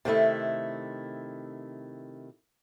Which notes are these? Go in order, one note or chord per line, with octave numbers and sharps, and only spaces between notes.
C3 D#3 A3 E4